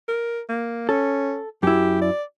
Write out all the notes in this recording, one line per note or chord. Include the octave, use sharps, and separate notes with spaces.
A#4
A#3
C#4 A4
F#2 E4 G4
D5